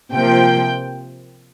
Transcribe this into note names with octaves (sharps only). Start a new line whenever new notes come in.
C3 F3 A#3 G5